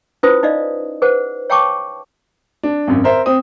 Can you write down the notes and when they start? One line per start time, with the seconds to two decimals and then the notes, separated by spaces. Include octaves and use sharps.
0.23 C#4 E4 F4 B4 C5 D#6
0.43 D#4 D5 D#5 F5
1.02 G#4 B4 C5 F#5
1.50 C#5 F5 G5 A5 C#6 D6
2.63 D4
2.87 G#1 F#2
3.04 A#4 C5 E5
3.26 C4 D#6